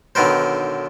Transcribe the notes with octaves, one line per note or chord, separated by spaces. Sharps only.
B1 D3 D#3 B3 A#4 C5